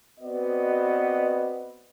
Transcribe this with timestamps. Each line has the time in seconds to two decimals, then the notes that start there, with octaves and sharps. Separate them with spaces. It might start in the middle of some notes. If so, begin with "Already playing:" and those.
0.20 B3 C4 F#4 B4 D5 D#5